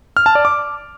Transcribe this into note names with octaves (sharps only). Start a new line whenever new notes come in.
F6
A5
D5
D6